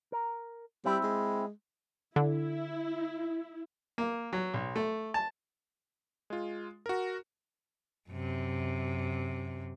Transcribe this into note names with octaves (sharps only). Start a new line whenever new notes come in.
A#4
G3 C4 E4
G#3
D3 E4
A#3
F#3
B1
A3
A5
G#3 F4
F#4 A#4
F#2 C3